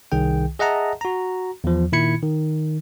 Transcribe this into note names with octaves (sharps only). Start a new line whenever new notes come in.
C2 D#3 G#4 G5
G#4 D#5 E5 F#5 A5 A#5
F#4 A#5
E2 F3
A#2 D#3 E4 B5 G#6 C#7
D#3